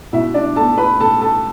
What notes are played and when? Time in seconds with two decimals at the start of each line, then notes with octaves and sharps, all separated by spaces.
0.13 B2 E4 E5
0.34 D4 D5
0.56 B3 D4 A4 A5
0.77 B4 B5
1.00 B2 A4 A5
1.21 A4 A5